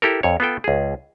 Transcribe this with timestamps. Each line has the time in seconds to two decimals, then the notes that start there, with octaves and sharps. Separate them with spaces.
0.02 E4 G4 A4 A#4
0.23 F2 C#5
0.40 B3 F4 A4 G5
0.64 C#2 G#4